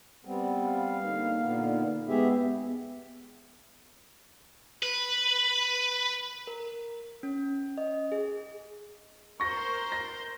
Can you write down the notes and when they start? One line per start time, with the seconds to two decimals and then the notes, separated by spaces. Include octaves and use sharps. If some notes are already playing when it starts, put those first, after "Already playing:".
0.25 G3 B3 C4
0.67 F5
1.03 D3 A#3 D#4
1.40 A#2 D3 B3
2.08 G#2 G#3 B3 G4 G#4 E5
4.83 B4
6.47 A#4
7.23 C#4
7.78 D#5
8.12 G#4
9.40 A#4 C5 C#6 A#6
9.92 A#6